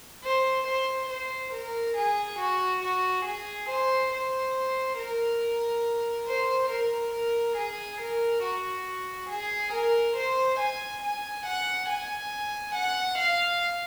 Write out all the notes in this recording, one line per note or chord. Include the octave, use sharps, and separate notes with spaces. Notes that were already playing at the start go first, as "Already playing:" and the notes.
C5
C5
C5
A#4
G#4
F#4
F#4
G#4
C5
C5
A#4
C5
A#4
A#4
G#4
A#4
F#4
G#4
A#4
C5
G#5
G#5
F#5
G#5
F#5
F5